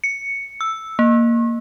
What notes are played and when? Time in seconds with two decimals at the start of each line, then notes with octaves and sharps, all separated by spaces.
0.04 C#7
0.61 E6
0.99 A#3